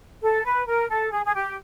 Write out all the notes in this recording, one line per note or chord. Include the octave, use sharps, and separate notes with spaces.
A4
B4
A#4
A4
G#4
G#4
G4